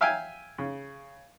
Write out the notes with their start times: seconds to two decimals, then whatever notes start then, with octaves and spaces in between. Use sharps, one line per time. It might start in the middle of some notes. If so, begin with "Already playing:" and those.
0.01 E5 F5 G5 G#5
0.58 C#3